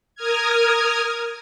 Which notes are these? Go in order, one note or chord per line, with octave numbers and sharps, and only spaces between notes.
A#4 D#6 F6 G#6